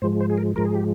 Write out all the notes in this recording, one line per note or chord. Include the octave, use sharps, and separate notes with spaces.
G#2 F3 G#3 C5
C5
G#4
A#4
G#2 F3 G#3 A#4
G#4
G4